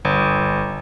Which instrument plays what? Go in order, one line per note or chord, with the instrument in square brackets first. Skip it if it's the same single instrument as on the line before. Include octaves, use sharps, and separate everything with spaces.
[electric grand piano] G1